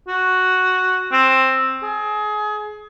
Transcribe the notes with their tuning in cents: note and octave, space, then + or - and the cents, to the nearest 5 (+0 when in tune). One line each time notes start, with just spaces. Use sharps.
F#4 +0
C4 +10
G#4 +25